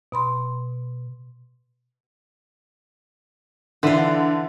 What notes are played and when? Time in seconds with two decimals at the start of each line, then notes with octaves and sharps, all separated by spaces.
0.12 B2 B5 C6
3.83 D3 E3 F4